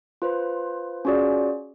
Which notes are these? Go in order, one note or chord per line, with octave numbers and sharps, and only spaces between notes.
F4 B4 C5
C#4 F4 F#4 G#4 D5